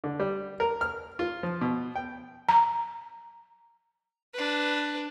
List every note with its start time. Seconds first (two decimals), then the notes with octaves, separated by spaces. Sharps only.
0.04 D3
0.20 G3
0.60 A#4
0.81 F6
1.19 F4
1.43 F3
1.61 B2
1.95 G5
2.49 A#5
4.34 D4 B4